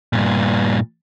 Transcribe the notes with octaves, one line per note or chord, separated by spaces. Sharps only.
G2 A#2